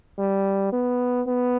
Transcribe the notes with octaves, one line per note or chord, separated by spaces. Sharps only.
G3
B3
B3